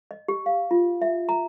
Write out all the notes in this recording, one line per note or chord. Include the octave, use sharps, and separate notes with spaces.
D#5
G4
F5
F4
E5
A#5